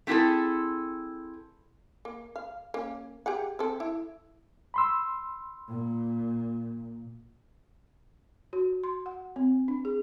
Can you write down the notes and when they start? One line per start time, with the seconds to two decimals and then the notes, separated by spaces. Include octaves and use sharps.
0.07 A3 C4 E4 F#4 G#4 A4
2.05 A#3
2.36 F5
2.74 A#3 C#4
3.26 G4 G#4 F#5
3.59 C4 A4
3.80 E4
4.74 B5 C6 E6
5.68 A#2
8.53 F#4
8.84 C6
9.06 F#5
9.36 C4
9.68 D4
9.85 G#4